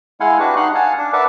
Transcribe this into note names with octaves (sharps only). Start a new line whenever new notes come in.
G#3 E4 F5 F#5 G#5 C6
D4 F#4 G4 B4
D#4 F#5 C6 F#6
F5 F#5 G#5 A5
D4
A#4 B4 D5 E5 F#5 A5